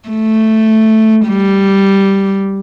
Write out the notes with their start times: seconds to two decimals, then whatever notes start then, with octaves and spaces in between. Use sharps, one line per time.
0.09 A3
1.27 G3